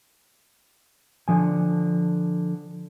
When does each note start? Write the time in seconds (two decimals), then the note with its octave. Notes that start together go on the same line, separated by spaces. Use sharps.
1.28 D3 F3 G#5